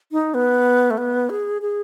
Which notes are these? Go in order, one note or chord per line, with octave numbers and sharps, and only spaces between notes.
D#4
B3
A3
B3
G#4
G#4